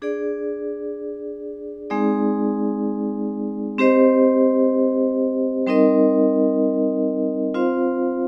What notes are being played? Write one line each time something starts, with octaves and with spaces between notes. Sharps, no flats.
D4 G#4 D5
G#3 C4 D#4 G#4 D5
C4 G4 C5 D#5
G3 C4 D#4 A#4 D#5
C4 F4 C5 F5